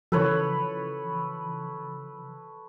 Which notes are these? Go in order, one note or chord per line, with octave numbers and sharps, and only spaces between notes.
C#3 E3 F3 A4 B4 C#5